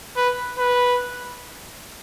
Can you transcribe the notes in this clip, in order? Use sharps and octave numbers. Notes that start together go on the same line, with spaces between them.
B4
B4